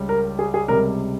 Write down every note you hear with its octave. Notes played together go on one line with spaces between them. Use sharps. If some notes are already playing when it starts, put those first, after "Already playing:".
Already playing: C#2 C#3 G3
A#4
G#4
G#4
C#2 C3 G3 A#4